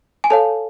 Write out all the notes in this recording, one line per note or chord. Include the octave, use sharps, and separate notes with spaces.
G#5
A4 C#5 F5 A5